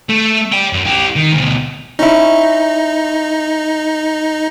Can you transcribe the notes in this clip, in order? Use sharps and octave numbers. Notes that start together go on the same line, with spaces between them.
A3
D5 G5
F#2
E4 G4
D#3
D2 B2
C#4 D#4 E4